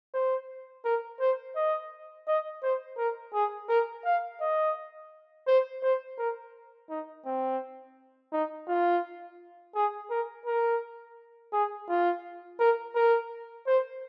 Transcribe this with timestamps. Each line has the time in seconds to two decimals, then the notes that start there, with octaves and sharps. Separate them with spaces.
0.14 C5
0.85 A#4
1.20 C5
1.56 D#5
2.27 D#5
2.63 C5
2.98 A#4
3.34 G#4
3.69 A#4
4.05 F5
4.41 D#5
5.47 C5
5.83 C5
6.18 A#4
6.90 D#4
7.26 C4
8.32 D#4
8.68 F4
9.75 G#4
10.10 A#4
10.46 A#4
11.53 G#4
11.89 F4
12.60 A#4
12.96 A#4
13.67 C5